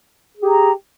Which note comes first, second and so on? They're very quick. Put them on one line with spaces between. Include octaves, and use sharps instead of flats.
G#4 G4 A#5